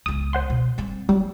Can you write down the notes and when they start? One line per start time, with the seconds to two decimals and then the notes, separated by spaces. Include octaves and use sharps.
0.06 C#2 B3 D#6
0.33 C5 F#5 C6
0.50 B2
0.78 G3 C4
1.09 F#3 G3